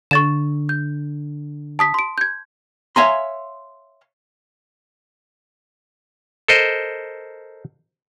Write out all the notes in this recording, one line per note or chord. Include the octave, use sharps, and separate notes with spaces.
D3 C#6 A6 E7
G6
A5 D#6 B6
C6 D7
G6 G#6
C#5 E5 F5 G#5 A#5 C6
A4 A#4 C5 D#5